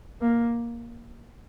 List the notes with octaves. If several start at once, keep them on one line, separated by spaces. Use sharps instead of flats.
A#3